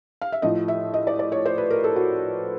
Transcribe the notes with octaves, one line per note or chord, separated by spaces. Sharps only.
F5
E5
A2 F3 D#5
E5
D#5
D5
D5
C#5
C5
B4
A#4
A4
F#4